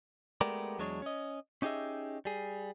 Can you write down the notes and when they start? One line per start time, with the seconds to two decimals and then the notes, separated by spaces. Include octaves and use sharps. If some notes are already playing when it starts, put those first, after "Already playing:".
0.41 G#3 A3 B3 G4 A#4 D5
0.79 E2 F#3 G#3 D4 C#5
1.02 C#4 D#5
1.62 C#4 D#4 G4 G#4 D#5 E5
2.25 G3 G#4